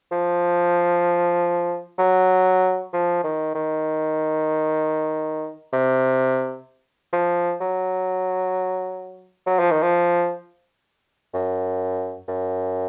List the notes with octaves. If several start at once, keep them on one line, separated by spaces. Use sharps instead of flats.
F3
F#3
F3
D#3
D#3
C3
F3
F#3
F#3
F3
D#3
F3
F#2
F#2